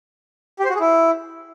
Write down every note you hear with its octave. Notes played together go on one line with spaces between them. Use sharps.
G4
C5
F#4
G#4
E4